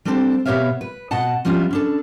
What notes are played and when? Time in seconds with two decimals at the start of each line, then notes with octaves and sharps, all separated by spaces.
0.05 G3 C4 D4 A4 A#4 C5
0.45 B2 B3 G4 C#5 E5 F5
0.81 B4
1.11 B2 D#5 F#5 A5
1.45 F3 G3 B3 C#4 E4 F4
1.71 C#4 D4 A4